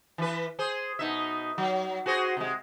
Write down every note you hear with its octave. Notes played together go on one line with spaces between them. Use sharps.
E3 B4
G#4 C5
B2 D#4 E5
F#3
F#4 G#4 C5
C3 G#3